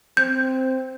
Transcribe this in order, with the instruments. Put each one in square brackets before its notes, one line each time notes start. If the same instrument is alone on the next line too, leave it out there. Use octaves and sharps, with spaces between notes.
[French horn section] C4 [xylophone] G6